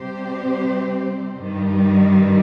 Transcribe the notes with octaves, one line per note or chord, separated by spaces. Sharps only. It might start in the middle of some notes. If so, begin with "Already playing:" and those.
Already playing: C3 G3 C4 G4 C5
G2 D#3 G3